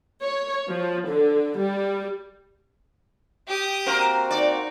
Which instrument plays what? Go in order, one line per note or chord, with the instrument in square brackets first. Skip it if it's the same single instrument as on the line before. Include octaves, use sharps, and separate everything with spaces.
[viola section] C#5
F3
D3
G3
[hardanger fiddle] G4 D#6
[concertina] A#3 C4 F#4 [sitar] A#4 C5
[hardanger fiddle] D#4 [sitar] D5